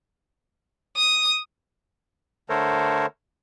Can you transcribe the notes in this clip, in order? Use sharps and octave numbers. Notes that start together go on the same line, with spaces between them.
D#6
D3 A3 A4 A#4 C5 C#5